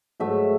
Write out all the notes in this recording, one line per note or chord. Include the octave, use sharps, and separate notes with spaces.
G#2 F#3 A3 E5